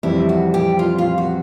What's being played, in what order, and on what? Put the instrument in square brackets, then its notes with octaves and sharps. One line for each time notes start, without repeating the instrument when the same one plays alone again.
[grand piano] F2 C3 E3 G3 [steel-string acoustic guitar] E4
[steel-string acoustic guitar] F#4
G4
F4
F4
F#4